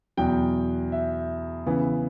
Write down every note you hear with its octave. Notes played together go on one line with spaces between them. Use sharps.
E2 B2 F#3 G5
E5
C#3 E3 B3